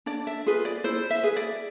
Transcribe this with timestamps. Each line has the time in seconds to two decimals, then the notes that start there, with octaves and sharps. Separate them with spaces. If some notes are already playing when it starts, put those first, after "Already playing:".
0.06 D4 D5
0.27 E5
0.46 F4 G#4 B4
0.65 D5
0.84 E4 C5
1.11 E5
1.23 G#4 B4
1.37 D5